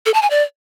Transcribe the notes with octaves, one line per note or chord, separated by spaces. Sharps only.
A4
A5
G#5
D5